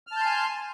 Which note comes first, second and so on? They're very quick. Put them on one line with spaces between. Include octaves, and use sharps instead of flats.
F6 A5 G6 C6 G#5